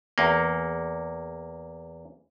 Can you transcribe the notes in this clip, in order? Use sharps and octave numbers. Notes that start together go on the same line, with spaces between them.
E2 A#3